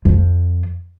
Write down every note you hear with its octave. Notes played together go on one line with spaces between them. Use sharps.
F2 F3